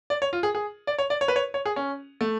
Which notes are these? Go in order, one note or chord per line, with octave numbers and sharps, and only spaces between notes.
D5
C#5
F4
G#4
G#4
D5
C#5
D5
C#5
B4
C#5
C#5
G#4
C#4
A3